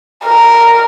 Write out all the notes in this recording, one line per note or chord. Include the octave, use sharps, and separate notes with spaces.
A#4